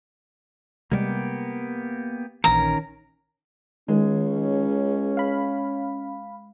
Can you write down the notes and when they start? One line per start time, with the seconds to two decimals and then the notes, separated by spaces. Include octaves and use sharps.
0.92 C3 G3 G#3 A#3 B3 G4
2.44 A#1 D#3 E3 C#4 A#4 A#5
3.88 C#2 D#3 G#3 C#4
5.17 F5 B5